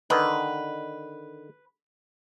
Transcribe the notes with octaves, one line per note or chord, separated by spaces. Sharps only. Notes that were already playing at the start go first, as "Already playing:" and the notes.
D3 D#3 B4